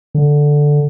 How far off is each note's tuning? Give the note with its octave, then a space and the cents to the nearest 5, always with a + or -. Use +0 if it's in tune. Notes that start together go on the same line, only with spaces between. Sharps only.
D3 +0